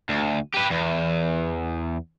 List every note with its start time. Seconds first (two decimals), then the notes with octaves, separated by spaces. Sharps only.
0.09 D2
0.54 G4 B4
0.71 E2